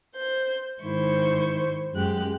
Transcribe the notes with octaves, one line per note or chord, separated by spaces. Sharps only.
C5 G6
G#2 D#3 E4 C5 C#6 G6
F#2 G#3 G4 F#6